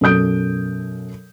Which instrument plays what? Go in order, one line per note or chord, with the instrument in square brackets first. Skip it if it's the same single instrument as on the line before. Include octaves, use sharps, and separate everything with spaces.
[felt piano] F#2 B2 A4 D#6 G6 D7